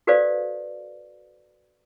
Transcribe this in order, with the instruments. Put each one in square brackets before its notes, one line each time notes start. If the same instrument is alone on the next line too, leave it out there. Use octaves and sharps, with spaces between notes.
[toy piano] F#4 A4 B4 C5 D5 F5